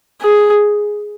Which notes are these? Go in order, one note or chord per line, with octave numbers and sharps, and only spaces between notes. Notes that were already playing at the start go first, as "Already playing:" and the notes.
G#4